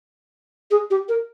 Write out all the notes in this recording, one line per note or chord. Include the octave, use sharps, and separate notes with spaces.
G#4
G4
A#4